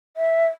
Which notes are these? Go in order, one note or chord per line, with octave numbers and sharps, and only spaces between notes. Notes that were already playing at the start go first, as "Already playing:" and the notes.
E5